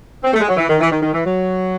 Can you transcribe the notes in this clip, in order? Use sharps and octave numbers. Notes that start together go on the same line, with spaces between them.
C4
A3
G#3
F#3
E3
D#3
E3
D#3
D#3
E3
F#3